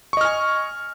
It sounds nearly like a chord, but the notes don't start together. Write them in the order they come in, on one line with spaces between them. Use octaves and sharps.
C#6 D#5 F6 G#5